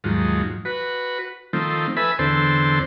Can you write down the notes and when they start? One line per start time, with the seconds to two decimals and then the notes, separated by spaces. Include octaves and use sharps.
0.04 D#2 G#2 F3 F#3
0.65 F#4 B4
1.53 D#3 F3 A3 C4
1.97 A4 B4 E5 G#5 B5
2.19 E2 D3 C4 A4 C5